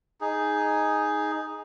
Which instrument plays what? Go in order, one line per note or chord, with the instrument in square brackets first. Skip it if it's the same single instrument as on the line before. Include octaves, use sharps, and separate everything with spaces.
[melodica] D#4 G#4